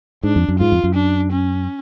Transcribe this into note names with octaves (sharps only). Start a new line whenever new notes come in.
G#2 D4
F2
F#2
G#2 F4
F2
F#2
D4
C#4